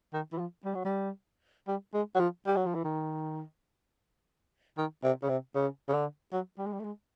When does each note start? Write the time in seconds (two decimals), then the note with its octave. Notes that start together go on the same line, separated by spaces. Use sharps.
0.13 D#3
0.32 E3
0.39 F3
0.65 G3
0.75 F#3
0.85 G3
1.68 G3
1.94 G#3
2.15 F#3
2.20 F3
2.47 G3
2.56 F#3
2.66 F3
2.75 E3
2.84 D#3
4.78 D#3
5.04 C3
5.23 C#3
5.29 C3
5.55 C#3
5.88 C#3
5.94 D3
6.33 F#3
6.58 G3
6.66 G#3
6.73 G3
6.80 A3
6.84 G#3